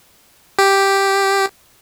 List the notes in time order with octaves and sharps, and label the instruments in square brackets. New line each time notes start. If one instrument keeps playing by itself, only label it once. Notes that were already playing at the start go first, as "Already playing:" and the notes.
[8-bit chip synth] G4